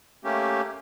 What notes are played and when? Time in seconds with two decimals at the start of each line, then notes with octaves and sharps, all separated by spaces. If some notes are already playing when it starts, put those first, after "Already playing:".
0.24 A3 A#3 C#4 G4